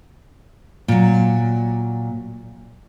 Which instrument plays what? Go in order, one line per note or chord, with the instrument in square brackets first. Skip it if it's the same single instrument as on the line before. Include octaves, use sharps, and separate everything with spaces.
[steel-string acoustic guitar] A#2 F#3